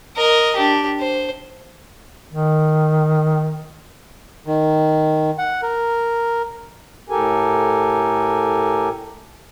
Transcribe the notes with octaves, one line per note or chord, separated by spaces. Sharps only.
A#4 D#5
D4 G4
C5
D#3
D#3
F#5
A#4
A2 G4 A4 A#4 G#5